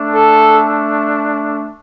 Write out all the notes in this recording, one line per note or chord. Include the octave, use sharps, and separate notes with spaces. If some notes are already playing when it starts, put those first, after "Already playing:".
Already playing: A3 D4
A4